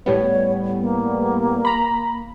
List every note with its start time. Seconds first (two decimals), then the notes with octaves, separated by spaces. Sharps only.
0.06 A2 G3 B3 C#5
0.81 A#3
1.65 A#5 B5